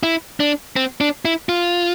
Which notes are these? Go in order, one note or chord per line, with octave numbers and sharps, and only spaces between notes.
E4
D4
C4
D4
E4
F4